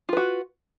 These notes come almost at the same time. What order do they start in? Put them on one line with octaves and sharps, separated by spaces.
F4 B4 F#4